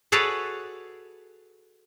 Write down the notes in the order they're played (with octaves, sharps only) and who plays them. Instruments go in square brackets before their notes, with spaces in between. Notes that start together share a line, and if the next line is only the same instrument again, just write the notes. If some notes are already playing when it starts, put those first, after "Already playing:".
[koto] F#4 G#4 A4 B4 C#5 D5